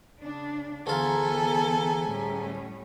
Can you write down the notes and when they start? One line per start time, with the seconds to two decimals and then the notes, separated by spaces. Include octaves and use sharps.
0.20 C#3 D4
0.87 D2 E3 B3 F4 G#4 A4 G#5 A#5
2.08 A2 G3 C#4